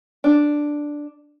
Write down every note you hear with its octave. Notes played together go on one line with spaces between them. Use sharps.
D4